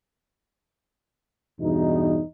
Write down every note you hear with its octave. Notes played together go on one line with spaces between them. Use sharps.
E2 G2 B2 D#4